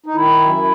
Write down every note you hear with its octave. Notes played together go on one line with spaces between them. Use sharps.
D#4
D#3 E4
F#2